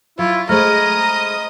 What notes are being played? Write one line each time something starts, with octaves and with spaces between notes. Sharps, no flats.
F#3 E4 F4
G#3 A3 C5 D#5 A#5 B5 D#6 F6